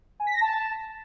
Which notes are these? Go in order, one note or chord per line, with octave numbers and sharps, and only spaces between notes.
G#5
B6
A#6
A5